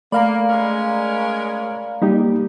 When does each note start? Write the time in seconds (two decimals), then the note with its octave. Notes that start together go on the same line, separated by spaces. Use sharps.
0.12 A3 A#3 D5 F5 A#5 B5
0.49 G#3 C#4 A#4
2.02 G3 A#3 D#4 G4